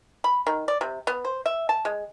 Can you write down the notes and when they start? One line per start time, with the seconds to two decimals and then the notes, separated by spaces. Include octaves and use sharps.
0.24 B5
0.47 D#3
0.68 D5
0.81 C3
1.07 B3
1.25 C5
1.46 E5
1.69 A5
1.85 G#3